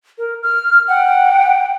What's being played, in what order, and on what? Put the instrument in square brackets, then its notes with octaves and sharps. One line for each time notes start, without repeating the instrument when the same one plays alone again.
[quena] A#4
F6
[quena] F#5 [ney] G5